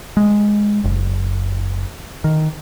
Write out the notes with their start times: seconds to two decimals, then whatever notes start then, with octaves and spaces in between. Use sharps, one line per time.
0.17 G#3
0.84 F#1
2.24 D#3